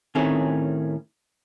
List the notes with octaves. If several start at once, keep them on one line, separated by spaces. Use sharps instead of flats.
A2 D#3 A3 C4 C#4 G#4